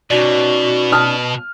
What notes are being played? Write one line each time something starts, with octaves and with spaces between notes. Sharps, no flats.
B2 C#4 D#4 F#4 D5
A5 D#6 F6